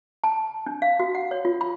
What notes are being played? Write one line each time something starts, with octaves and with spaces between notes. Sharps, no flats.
A5
D4
F5
F#4
F#5
C#5
F4
B5